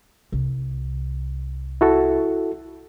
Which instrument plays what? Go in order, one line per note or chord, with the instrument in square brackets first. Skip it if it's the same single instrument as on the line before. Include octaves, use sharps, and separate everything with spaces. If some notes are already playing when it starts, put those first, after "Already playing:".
[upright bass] C2
[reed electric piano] E4 F#4 A4